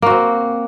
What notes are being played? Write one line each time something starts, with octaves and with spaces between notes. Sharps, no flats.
A#3 C4 F#4